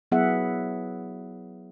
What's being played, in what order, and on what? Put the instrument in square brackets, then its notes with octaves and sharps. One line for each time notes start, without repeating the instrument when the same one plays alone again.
[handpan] F#3 B3 E4 G#4 E5 F#5